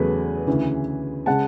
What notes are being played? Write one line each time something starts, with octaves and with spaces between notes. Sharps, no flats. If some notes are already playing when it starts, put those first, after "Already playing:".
Already playing: E2 C#3 F#3 A3 G#4 B4
D2 C#3 E3
C#3 G#3 F#5 A5